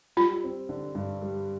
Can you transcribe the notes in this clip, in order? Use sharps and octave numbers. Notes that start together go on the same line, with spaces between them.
G3 F4
C4
D3
G2
G3